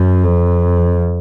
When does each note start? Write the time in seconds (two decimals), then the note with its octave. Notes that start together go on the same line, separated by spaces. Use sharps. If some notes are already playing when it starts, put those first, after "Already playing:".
Already playing: F#2
0.23 F2